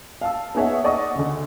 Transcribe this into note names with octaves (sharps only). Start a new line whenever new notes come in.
F5 A5 E6
B3 D#4 G#4 C#5 E5 F#5
D5 D#5 F#5 C#6 D#6
D2 C#3